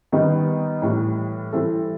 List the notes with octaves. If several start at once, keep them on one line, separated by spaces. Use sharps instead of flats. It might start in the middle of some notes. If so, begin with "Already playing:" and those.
D#3 G3 B3 D#4
A2 E3 G3
E3 G3 C4 E4 A4